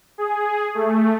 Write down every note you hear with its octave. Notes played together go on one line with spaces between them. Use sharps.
G#4
A3